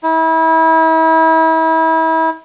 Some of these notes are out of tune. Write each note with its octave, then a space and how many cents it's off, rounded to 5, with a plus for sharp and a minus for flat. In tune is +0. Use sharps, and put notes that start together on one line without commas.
E4 -35